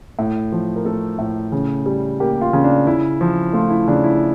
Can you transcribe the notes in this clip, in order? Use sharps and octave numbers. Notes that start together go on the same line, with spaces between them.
A2
F3
A#4
A3 A4
A2
C#3
G3
A#3 G4
F4
C#3
D4
C#3 E4
F3
A3 F4
E4
C#3 D4
E4